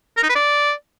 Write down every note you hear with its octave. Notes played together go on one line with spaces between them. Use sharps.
A#4
D#4
B4
D5